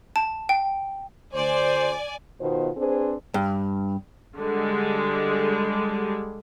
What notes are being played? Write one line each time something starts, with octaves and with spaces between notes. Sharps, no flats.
A5
G5
D2 C5 D5 G#5
B2 D#3 B3 F4 C5
C4 D4 G#4 B4 C5
G2
D3 G3 G#3